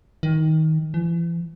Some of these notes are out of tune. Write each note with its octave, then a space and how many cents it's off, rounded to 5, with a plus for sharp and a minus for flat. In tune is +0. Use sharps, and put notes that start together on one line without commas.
D#3 +20
E3 +40